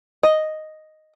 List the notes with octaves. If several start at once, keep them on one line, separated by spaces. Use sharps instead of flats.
D#5